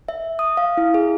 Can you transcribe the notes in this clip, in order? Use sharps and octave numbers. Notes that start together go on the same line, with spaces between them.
E5
D#6
F5
E4
G#4